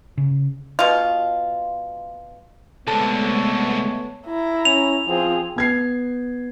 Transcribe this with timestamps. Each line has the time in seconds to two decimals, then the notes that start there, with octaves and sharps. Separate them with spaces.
0.18 C#3
0.79 B2 F4
2.87 C2 D3 G#3 A3 B3 A4 C#5 A5
4.26 E4 A#5
4.65 C#4 F7
5.08 F3 C4 G#4
5.56 B3 G#6 C7